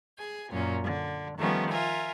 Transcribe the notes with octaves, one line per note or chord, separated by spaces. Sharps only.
G#4 G#5
F#2 A#2 C#4
D3
D#3 F3 G3 A3 B3 C#4
F4 A#4 E5 G#5